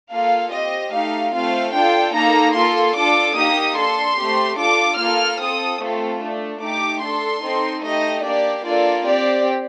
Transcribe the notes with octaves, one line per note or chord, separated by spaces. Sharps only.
A#3 F4 A4 F5
C4 G4 D#5
A3 D#4 G4 F5
A3 C4 F4 F5
D4 F4 A4 G5
A#3 D#4 A4 A#5
A#3 F4 A4 C6
D4 F4 A4 D6
A#3 D#4 G4 D#6
D4 A4 C6
A3 C4 G4
D4 F4 A4 D6
A#3 F4 A4 F6
C4 F4 A4 D#6
A3 C4 F4 A4
A3 D4 A4
A3 D#4 G4 D6
D4 A4 C6
C4 D#4 A4
A3 D#4 G4 D#5
A#3 D4 G4 D5
A#3 D4 F4 A4 D5
C4 G4 D5